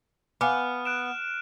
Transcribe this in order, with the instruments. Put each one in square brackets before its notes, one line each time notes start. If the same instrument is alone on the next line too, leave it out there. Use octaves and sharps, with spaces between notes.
[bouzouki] B3 [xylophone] F5 G#5 D6 [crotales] F6
[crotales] F#6 D7 E7